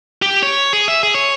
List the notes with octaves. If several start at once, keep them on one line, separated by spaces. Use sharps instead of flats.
G4
C#5
G#4
E5
G#4
C#5